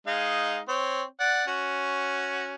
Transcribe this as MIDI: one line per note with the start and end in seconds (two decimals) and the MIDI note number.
0.07 0.59 56
0.07 0.59 63
0.07 0.59 77
0.68 1.02 60
0.68 1.02 73
1.20 1.45 74
1.20 1.45 78
1.47 2.55 61
1.47 2.55 66